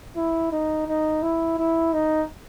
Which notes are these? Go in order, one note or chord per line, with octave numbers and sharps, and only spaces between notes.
E4
D#4
D#4
E4
E4
D#4